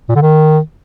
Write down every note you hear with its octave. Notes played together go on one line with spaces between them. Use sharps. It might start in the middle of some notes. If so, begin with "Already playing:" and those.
A#2
D3
D#3